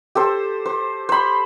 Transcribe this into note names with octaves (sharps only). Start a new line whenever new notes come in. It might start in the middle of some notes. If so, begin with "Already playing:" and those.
G4 A4 C5
C5
C5 B5